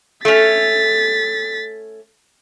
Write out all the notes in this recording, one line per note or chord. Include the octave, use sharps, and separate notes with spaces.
A3 C#4 A6 B6